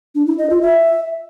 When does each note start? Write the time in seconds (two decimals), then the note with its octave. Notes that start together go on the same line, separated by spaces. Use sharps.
0.15 D4
0.27 E4
0.38 D#5
0.50 F4
0.62 E5